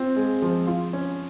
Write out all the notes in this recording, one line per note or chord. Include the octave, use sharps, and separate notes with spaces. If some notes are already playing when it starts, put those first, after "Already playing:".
Already playing: C4 F4
G#3
F3
F4
C#4